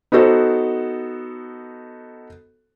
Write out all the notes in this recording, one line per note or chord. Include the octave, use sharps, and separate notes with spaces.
B3 D#4 F#4 A4 C5